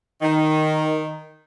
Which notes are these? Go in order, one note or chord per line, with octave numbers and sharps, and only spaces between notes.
D#3